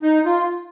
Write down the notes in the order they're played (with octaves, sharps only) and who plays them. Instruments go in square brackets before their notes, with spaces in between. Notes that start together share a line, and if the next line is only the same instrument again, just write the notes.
[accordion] D#4
F4